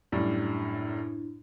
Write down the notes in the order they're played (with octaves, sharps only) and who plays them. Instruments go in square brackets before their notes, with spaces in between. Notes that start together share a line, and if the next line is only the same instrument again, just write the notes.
[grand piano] F#2 A2 G3 [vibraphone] D4 E4